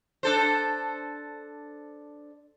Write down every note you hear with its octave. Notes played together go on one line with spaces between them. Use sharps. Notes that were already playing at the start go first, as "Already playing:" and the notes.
D4 A4 C5